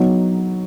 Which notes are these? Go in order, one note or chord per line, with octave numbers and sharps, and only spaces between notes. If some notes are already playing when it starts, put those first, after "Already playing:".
Already playing: F#3 B3 D#4